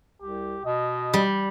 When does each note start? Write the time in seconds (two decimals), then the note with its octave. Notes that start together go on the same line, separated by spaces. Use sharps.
0.22 C2 G4
0.65 B2 D#5
1.14 G3